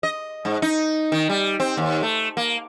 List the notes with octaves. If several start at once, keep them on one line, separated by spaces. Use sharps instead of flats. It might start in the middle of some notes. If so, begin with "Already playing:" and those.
D#5
G#2
D#4
D#3
G3
C4
D#2
A3
A#3